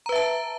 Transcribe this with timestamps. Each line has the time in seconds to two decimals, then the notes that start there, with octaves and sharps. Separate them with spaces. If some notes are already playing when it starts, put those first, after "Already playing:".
0.06 A#5
0.09 B4
0.12 E5
0.16 A5